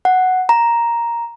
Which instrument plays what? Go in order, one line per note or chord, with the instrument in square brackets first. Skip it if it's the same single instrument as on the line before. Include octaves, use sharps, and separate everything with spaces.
[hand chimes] F#5
A#5